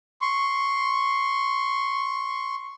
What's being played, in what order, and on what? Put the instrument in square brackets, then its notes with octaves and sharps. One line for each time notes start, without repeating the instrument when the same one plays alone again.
[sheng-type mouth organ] C6 C#6